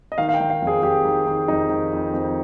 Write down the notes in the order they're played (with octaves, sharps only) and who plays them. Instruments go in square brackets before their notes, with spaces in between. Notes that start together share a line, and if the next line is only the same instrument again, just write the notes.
[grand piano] D#5
D#3 F5
F5
G5
D#3
F5
F2
G#4
F2 G4
D#3
D#3
F2 D#4
D#3
F2
F2